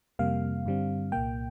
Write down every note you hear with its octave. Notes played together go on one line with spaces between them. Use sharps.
F2 C3 G3 A#3 F5
G2 D3 G3 C4
C2 A#2 A#3 G5